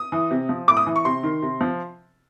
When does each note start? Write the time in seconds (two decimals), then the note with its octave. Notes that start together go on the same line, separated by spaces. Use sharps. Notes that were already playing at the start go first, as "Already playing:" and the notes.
Already playing: D#6
0.12 E3
0.31 C3
0.49 F3
0.68 A2 D6
0.77 D#6
0.87 E3
0.96 C#6
1.05 C3 C6
1.23 D#3
1.42 C3
1.61 F3